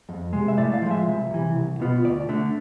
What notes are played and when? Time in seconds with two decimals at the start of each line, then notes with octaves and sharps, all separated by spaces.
0.09 F2
0.33 C3 G#3
0.48 E5
0.57 A2 D5
0.74 F5
0.82 F3 G#3
0.91 E5
1.07 C2
1.31 C3 E3
1.56 C2
1.80 B2 B3 F4
2.05 D2 D5
2.29 D3 A3